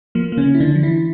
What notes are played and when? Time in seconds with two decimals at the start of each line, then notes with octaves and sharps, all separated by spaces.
0.15 F3 A#3
0.32 A#3
0.37 C#3 C#4
0.45 F3
0.55 E4
0.60 D3 D4
0.75 F3
0.83 E3 E4